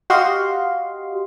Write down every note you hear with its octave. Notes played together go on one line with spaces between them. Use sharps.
F#4 G4 D#5 F5 C6